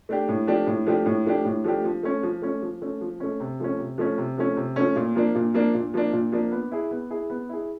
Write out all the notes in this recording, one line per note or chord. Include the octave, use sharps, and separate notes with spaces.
A3 D4 G4
A2
F3 A3 D4 G4
A2
F3 A3 D4 G4
A2
F3 A3 D4 G4
A2
F3 A3 D4 G4
F3
A3 C#4
F3
A3 C#4
F3
A3 C#4
F3
A3 C#4
C3
F3 A3 C#4
C3
F3 A3 C#4
C3
F3 A3 C#4
C3
F3 A3 C#4
A#2
F3 A#3 D4
A#2
F3 A#3 D4
A#2
F3 A#3 D4
A#2
F3 A#3 D4
B3
E4 G#4
B3
E4 G#4
B3
E4 G#4